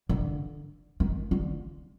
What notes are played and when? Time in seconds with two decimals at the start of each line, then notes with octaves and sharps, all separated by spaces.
0.09 D3
1.00 D#3
1.31 D3